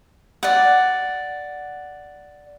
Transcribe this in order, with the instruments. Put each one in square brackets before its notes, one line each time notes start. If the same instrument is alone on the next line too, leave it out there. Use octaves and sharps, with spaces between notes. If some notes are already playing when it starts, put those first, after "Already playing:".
[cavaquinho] D5 F#5